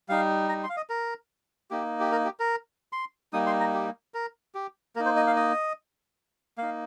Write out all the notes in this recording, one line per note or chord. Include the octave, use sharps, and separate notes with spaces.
G3 D#4 F5
A#5
C6
F5
D#5
A#4
A#3 D#4 G4
G4
A#4
G4
A#4
C6
G3 A#3 D#4 D#6
C6
A#5
G4
A#4
G4
A#3 D#4 A#4
C5
D#5
F5
D#5
A#3 D#4 F5